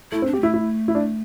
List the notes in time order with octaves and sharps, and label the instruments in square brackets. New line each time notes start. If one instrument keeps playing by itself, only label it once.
[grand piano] A3 [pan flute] E4
[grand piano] C4
[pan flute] D4
[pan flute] C4 [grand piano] G4
[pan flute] A3 [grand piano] E4
[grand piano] E4
E4
D4